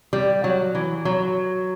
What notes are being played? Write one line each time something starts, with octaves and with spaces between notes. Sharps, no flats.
G3
F#3
E3
F#3